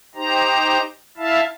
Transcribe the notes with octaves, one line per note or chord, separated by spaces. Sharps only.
D#4 G4 C5 A#5
E4 E5 F5 A5